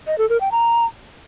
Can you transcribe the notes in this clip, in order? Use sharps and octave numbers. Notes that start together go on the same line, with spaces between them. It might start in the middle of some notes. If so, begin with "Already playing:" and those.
D#5
A4
A#4
G5
A#5